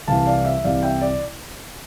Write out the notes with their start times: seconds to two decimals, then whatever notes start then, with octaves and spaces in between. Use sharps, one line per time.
0.08 C2 C3 E3 F5 A5
0.26 D5 F5
0.45 E5
0.64 C2 C3 E3 D5 F5
0.82 E5 G5
1.01 D5